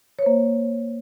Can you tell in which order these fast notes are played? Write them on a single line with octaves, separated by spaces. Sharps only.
C#5 C5 A#3